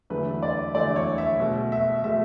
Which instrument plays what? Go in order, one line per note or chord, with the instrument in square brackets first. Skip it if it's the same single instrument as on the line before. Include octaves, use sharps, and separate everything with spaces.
[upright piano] E2 D3 F#3 A3 B4
D5
E2 D3 F#3 A3 D5
C#5
E5
B2 A3
E5
B2 A3 E5